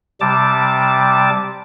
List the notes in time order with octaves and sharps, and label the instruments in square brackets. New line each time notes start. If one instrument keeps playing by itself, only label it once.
[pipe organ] C3 G3 A5 D6